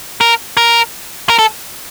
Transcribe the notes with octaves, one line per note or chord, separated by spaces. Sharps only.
A#4
A#4
A#4
A4